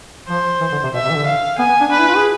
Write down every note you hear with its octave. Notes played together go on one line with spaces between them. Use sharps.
F3 C5
E3
D3
C3
B2 E5
C3
E3
D3
F5
B3 G#5
B3
D4
D4 B4
E4
F4
G#4